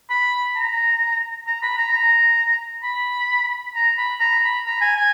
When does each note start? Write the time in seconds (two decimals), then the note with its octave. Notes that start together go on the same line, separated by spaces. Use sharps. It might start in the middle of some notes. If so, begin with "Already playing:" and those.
0.10 B5
0.56 A#5
1.47 A#5
1.63 B5
1.78 A#5
1.93 A#5
2.83 B5
3.75 A#5
3.98 B5
4.20 A#5
4.43 B5
4.66 A#5
4.81 G#5
4.96 G#5